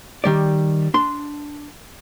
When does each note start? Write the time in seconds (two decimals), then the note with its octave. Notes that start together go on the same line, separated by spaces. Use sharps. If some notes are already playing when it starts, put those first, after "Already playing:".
0.24 D#3 G3 D5
0.94 D4 C6